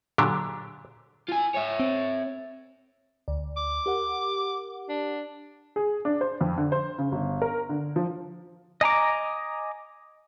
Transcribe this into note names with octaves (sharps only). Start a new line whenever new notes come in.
A#2 D3 F#3 D4 G4
F4 G#5
C#5 E5
C4
D2 D5
D6
G4 A#4 F#5
D4
G#4
D4
C5
F2
D3
C5
C#3
G1
A#4
D3
F3
D#5 G#5 A#5 D6